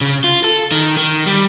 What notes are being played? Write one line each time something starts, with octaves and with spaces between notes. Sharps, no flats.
C#3
F4
A4
D#3
D#3
G3